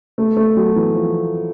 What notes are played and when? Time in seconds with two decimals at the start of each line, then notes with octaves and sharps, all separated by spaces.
0.18 A3
0.37 A3
0.57 F#3
0.76 E3
0.95 F3